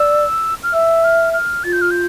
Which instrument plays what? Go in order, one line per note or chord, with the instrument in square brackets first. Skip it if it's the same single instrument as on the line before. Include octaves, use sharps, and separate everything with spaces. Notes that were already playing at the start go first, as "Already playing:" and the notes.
Already playing: [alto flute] D5 [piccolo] E6
[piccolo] F6
[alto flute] E5 [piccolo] E6
[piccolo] F6
F6
[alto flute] F4 [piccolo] A6
[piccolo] G6
F6
G6